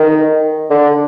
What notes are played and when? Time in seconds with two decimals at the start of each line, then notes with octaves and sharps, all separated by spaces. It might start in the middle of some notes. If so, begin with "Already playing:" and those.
Already playing: D#3
0.70 D3